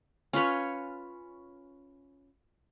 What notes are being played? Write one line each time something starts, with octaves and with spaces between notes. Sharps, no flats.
C#4 F4 B4 C#5